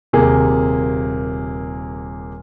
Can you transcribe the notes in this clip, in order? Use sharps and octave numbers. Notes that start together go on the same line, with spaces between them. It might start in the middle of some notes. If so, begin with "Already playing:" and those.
D#1 C3 A#3 G#4